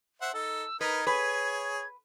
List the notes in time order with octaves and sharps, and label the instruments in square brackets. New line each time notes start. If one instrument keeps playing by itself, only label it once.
[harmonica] C5 E5 F#5
[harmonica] D#4 A4 [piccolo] E6
[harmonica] D#4 A#4 [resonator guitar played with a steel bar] B4 [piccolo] G#6
[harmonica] G#4 C#5 [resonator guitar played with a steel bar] B4